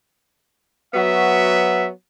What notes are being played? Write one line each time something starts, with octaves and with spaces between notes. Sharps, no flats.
F#3 B3 F#4 E5